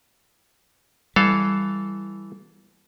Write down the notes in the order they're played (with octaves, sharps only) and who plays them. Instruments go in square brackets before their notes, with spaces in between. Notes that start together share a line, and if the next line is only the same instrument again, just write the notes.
[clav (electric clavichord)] E3 A4 F5 [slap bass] G3